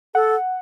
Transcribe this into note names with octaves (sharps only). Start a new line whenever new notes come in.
A4 F#5